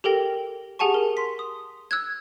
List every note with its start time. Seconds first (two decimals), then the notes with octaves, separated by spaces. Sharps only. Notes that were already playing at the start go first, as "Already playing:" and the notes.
0.04 G4 A4 A#4 G5 A#6
0.79 G4 G#4 F#5 G#5 A5 C#6
0.94 A#4
1.17 C6 B6
1.39 D#6
1.91 E6 F#6 G#6